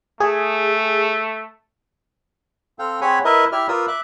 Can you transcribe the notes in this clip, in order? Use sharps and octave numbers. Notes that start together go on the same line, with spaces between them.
A3 G#4
C4 A4 F5 G5
C4 G#4 C#5 F#5 G#5 B5
E4 A#4 B4 D#5 E5
E4 G4 D5 E5 F6
F4 A#4 B4 D5 D#6 E6
E5 D6 F#6